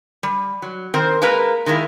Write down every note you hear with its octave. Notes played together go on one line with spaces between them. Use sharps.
G3
F#3
D#3 C4 A#4 C5
G#3 A#3 A#4 B4 A#5
D#3 G#3 A#3 D#4 E4